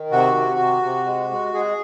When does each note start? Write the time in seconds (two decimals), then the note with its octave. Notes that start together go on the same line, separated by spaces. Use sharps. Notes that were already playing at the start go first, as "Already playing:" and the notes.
Already playing: D#3
0.11 C3 F#4
0.34 C3
0.59 C3
0.83 C3
1.06 G#3
1.31 G#3
1.54 G#3 G#4